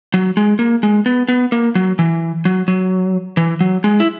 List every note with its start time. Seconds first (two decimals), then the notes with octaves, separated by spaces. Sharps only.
0.14 F#3
0.37 G#3
0.59 A#3
0.83 G#3
1.06 B3
1.28 B3
1.52 A#3
1.75 F#3
1.99 E3
2.45 F#3
2.68 F#3
3.37 E3
3.60 F#3
3.84 G#3
4.00 E4